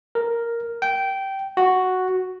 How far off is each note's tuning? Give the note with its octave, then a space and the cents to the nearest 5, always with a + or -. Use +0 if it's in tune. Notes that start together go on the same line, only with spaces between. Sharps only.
A#4 +0
G5 -15
F#4 +0